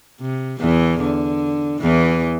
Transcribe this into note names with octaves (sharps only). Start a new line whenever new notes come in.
C3
E2 E3
D3
E2 E3